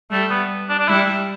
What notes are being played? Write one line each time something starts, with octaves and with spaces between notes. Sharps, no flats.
G3 A3
B3
D4
D4
G3 E4